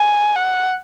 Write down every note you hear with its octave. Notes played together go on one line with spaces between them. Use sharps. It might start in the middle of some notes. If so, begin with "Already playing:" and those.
Already playing: G#5
F#5